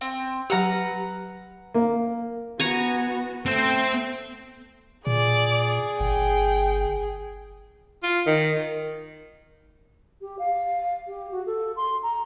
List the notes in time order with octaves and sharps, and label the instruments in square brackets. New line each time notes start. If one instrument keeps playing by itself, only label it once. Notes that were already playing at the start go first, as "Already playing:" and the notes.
[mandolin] C4
[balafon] F#3 G4 [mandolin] B4 F#5 A#5
[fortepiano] A#3
[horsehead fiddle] B3 F#4 [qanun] G#5 A#5 C#6
[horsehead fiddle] A3 [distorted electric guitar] C4 C5
[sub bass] A#2 [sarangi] G#4 [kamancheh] D5
[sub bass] G1 [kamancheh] G5
[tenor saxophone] F4
D#3
[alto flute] G4
F5
G4
F#4
A4
C6
A#5